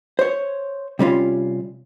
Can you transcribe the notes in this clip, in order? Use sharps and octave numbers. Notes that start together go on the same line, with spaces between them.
C5 C#5
C3 G3 C#4 F4